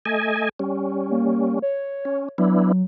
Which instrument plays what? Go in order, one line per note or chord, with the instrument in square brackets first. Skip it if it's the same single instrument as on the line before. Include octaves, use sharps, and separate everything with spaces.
[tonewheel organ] A3 D#5 G#5
G3 C#4
[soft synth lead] A#3
C#5
[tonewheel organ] C#4
[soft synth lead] F#3 [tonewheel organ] B3 D4 E4